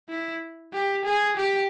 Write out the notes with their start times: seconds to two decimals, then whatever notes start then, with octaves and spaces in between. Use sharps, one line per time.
0.10 E4
0.73 G4
1.05 G#4
1.37 G4